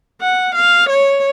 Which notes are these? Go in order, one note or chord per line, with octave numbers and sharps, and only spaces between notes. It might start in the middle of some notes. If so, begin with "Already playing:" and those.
F#5
F5
C#5